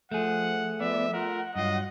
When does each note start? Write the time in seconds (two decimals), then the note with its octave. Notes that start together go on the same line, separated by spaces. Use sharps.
0.12 F3 A3 G#4 F#5
0.80 F3 B3 D5 E5
1.14 F4 A#4 F#5
1.56 G2 F#3 F4 D#5